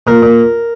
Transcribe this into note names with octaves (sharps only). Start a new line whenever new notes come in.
A#2 A#4
A#2